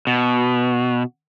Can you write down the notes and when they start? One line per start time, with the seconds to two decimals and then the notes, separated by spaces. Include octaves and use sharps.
0.07 B2